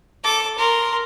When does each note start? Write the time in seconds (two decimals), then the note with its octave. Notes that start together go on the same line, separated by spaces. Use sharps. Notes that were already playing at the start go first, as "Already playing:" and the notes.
0.24 A4 D6
0.58 A#4 C6